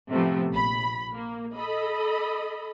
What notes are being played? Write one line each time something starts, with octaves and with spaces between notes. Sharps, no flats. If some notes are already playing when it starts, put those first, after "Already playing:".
A2 C3 F3 A3 B3
A#1 B5
A#3
A4 D#5 B5